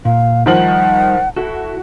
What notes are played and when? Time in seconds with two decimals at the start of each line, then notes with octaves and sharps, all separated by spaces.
0.05 A#2 F5
0.46 D#3 F3 G3 D#4 E4 F#5 F#7
1.36 E4 F#4 A4